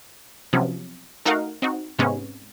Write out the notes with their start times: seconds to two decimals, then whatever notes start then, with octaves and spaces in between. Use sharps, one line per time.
0.53 C3 F3 F#3 B3 C#4
1.25 A3 D#4 F#4 A#4 F5 F#5
1.62 C4 D#4 F#4
1.99 G#2 C3 G#3 B3 C#4